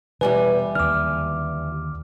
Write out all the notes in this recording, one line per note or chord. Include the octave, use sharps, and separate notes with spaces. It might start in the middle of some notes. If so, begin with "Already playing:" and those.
E2 B2 G3 B4 G#5
D#2 D3 D6 F6